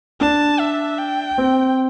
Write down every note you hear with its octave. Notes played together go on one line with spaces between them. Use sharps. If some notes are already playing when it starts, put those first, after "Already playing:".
D4 A5
E5
G5
C4